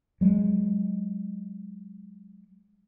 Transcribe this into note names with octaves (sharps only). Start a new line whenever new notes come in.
F#3 G#3